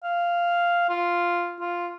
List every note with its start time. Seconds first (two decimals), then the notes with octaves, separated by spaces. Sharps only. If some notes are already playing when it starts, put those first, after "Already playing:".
0.03 F5
0.89 F4
1.60 F4